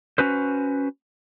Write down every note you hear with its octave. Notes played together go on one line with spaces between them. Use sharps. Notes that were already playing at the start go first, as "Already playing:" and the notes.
C#4 F#4 B4 C5